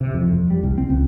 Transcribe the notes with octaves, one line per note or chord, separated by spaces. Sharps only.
C3
F2
F2
G3
C2
C4
C#2